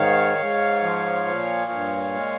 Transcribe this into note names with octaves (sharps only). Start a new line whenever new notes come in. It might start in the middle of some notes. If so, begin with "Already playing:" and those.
Already playing: G#2 D#3 C#5 F5
G#2
F3
A#2
G2
G#3